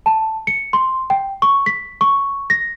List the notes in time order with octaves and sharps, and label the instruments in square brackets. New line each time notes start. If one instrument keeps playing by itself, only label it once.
[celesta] A5
C#7
C6
G5
C#6
B6
C#6
A#6